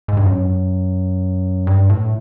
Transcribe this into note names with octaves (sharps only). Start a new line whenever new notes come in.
G#2
G2
F#2
G2
A2